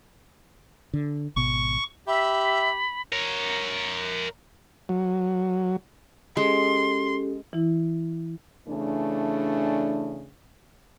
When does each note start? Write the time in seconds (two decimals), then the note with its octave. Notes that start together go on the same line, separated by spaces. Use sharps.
0.94 D3
1.36 G#1 B2 B3 C#6
2.07 G4 E5 B5
3.13 A#4 C#5
4.89 F#3
6.37 G#3 C#4 G4 A4 C6
7.53 E3 E4
8.67 C#3 E3 A3 D4